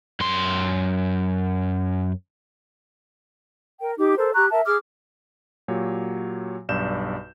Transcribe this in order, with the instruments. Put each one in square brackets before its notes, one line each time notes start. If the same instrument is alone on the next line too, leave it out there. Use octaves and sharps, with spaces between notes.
[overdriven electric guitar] F#2 C6
[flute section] A#4 G5
D#4 G4 D6
A4 A#4 C5
G4 A#5 C#6 F#6
A#4 E5 A5
G#4 D6 F6
[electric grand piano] A#2 F#3 G4 C#5
B1 G2 D5 G6 E7